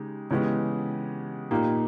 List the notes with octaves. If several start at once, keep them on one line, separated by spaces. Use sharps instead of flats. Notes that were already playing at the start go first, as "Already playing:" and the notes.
Already playing: C#3 G#3 D#4 G4
C#3 E3 G#3 B3 G4
A#2 A#3 D#4 G4